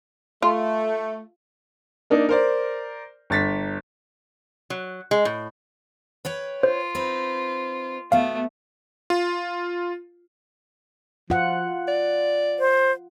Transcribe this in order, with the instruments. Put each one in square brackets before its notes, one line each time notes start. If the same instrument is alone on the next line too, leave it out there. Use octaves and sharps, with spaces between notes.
[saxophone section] A3 [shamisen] F4
[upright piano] A#3 D4 D#4
A#4 C5 D5
G1 A6 B6
[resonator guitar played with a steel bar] F#3
G#3
A2
[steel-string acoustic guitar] B4 C#5 G5
[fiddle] F4 [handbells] C5
[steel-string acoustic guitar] C4 D#4 B4
[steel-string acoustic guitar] B2 B3 [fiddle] A3 [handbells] F5
[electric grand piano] F4
[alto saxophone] F3 [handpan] F4 F#5
[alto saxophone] D5
[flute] C5